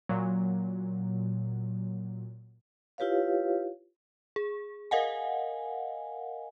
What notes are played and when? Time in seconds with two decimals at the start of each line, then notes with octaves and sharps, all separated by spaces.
0.09 A#2 F#3
2.98 E4 F4 G4 B4 C#5 F5
4.36 G#4
4.91 A#4 D#5 F5 F#5 G#5